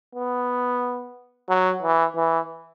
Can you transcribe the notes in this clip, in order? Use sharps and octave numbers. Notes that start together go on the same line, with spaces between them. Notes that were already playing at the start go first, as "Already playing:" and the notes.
B3
F#3
E3
E3